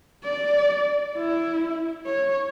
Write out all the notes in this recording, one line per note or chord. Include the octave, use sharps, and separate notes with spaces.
D5
E4
C#5